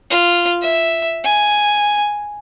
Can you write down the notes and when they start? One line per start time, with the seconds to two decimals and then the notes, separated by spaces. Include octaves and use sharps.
0.10 F4
0.61 E5
1.24 G#5